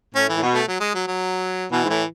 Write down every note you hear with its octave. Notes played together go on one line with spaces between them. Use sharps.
A2 C#4
E3
A2
B2
A3
F#3
G#3
F#3
F#3
B2 E3
G#2
A2 E3